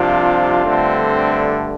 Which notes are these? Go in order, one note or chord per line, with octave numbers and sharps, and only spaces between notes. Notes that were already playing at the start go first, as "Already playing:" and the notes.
Already playing: C2 C3 F3 D4 F4
G2 D3 A3 C4
D4